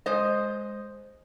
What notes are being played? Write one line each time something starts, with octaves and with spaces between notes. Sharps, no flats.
G#3 C5 D#5